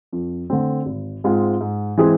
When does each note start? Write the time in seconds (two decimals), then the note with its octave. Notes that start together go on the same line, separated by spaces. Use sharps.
0.13 F2
0.50 D3 A3 C4
0.86 G#1
1.24 G#2 G#3 C4 F4
1.61 G#2
1.97 E3 G#3 C4 G#4